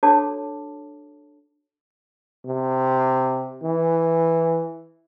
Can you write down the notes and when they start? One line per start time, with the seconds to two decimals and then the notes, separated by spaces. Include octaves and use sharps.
0.03 D4 F#4 A4 C#5 A5 D6
2.45 C3
3.62 E3